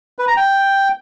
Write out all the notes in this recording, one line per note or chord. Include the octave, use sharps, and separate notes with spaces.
B4
A#5
G5